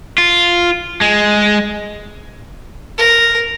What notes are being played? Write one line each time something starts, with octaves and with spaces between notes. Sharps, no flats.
F4
G#3
A#4